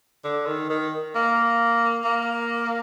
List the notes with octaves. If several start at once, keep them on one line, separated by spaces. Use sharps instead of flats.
D3
D#3
D#3
A#3
A#3